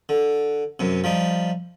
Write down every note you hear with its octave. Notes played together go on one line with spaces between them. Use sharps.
D3
F#2 C3
F3 G3 D#4